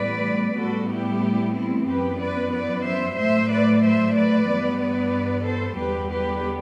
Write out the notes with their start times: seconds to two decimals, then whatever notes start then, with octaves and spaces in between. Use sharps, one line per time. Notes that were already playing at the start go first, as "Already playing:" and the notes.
Already playing: A2 E3 G3 B3 B4 D5
0.59 A2 G3 B3 F#4 A4
0.91 E4 G4
1.56 C4 E4
1.89 F#2 E3 B3 G4 B4
2.21 B4 D5
2.54 B4 D5
2.86 C5 E5
3.18 A2 F#3 A3 C5 E5
3.51 B4 D5
3.84 C5 E5
4.16 B4 D5
4.48 G2 E3 B3
4.80 B4 D5
5.46 A4 C5
5.78 E2 D3 G3 B3 G4 B4
6.11 G4 B4